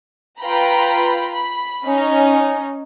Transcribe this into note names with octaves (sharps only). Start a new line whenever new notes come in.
F4 B4 G5 A#5 B5
B5
C#4 D#4